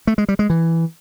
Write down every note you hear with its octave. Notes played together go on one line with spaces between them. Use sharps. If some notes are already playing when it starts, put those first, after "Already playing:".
A3
G#3
G3
G#3
E3